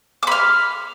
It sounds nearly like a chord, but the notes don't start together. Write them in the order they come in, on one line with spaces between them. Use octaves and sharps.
D6 B5 F6